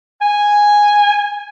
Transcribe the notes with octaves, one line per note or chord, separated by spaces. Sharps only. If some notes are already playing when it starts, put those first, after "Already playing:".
G#5